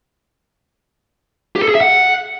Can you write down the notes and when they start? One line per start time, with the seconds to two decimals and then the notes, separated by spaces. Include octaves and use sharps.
1.56 G4
1.62 A4
1.68 G#4
1.75 E5
1.81 F#5